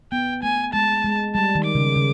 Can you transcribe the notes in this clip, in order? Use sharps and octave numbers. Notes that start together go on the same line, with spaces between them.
B3 G5
A3 G#5
G#3 A5
G#3
G3 A5
D#3
D6
C#3
C#3